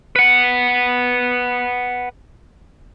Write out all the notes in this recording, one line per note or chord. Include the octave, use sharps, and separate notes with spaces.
B4 F#5